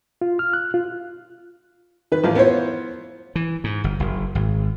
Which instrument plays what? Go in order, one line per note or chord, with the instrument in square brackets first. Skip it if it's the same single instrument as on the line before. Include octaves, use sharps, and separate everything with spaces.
[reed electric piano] F4
F6
F#6
F4
[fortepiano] D#3 B4
A1 F3 F5
B3 E4 F4 C5 C#5
[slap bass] E3
G#2
G1
F#1
G#1